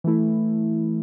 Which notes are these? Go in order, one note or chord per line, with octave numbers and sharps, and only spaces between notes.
E3 A3 E4